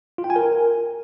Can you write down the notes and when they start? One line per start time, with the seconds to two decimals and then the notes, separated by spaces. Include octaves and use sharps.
0.18 F4
0.24 G5
0.30 G#5
0.36 A#4